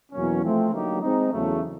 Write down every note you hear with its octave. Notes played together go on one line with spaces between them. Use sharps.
E2 B2 F#3 A#3 C#4
F3 A3 C4
D3 F#3 A#3 D#4 G4
G#3 C4 D#4
E2 C#3 F#3 A3